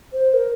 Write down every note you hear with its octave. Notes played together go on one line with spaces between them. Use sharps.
C5
A#4